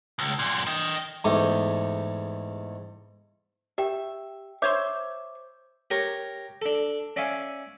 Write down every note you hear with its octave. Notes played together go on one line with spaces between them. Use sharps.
C#2
F#2 A#2
D#5 G5
E2 G#2 A3 G4 D#6
G4 E5 G5
C5 C#5 E5 D6 G6
G4 A#4 C#5
D4 A4
C#4 D5 E5 F5 G#5